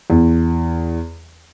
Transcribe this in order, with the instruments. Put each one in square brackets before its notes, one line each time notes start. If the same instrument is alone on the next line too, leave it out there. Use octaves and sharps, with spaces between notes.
[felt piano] E2